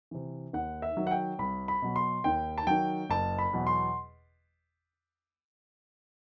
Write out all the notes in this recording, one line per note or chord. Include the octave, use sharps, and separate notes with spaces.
C3 E3
D#2 F#5
E5
D#3 F#3
F#5
G5
C2 B5
B5
B2 F#3
C6
D#2 G5
A5
D#3 F#3 G5
F#1 A5
B5
E2 B2 F#3
C6